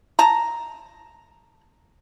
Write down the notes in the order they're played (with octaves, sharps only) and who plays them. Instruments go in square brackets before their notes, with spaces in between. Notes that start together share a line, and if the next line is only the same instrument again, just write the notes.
[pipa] A5 A#5